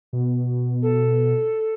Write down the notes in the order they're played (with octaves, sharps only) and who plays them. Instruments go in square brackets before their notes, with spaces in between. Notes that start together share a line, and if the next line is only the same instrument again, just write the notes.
[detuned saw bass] B2
[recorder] A4